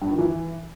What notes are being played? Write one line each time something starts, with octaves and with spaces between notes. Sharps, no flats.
G2
D#3
E3